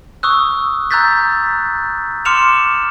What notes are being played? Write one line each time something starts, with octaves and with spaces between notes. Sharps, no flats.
C#6 D#6 E6 F#6
A#5 E6 F#6 G6 A6 B6
C6 D6 F6 C#7 E7 F7